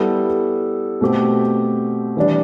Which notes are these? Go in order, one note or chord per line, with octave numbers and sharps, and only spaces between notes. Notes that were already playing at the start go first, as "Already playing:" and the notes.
Already playing: G3 B3 E4 A4
B2 A3 C4 G4
E3 G3 D4